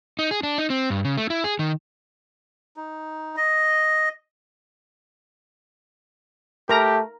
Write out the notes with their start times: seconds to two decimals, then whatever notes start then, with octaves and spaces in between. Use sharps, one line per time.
0.19 D#4
0.31 G#4
0.43 D4
0.58 D#4
0.70 C4
0.90 G2
1.05 C#3
1.17 A3
1.30 E4
1.44 G#4
1.59 D#3
2.76 D#4
3.37 D#5
6.69 A3 G4 A#4 A#5